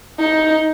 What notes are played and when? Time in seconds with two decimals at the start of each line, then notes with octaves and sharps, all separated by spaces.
0.19 D#4